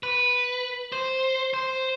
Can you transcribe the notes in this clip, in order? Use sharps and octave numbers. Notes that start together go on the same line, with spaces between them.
B4
C5
C5